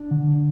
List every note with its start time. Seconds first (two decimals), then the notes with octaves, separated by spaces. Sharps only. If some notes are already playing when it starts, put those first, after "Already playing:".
Already playing: D4
0.11 D3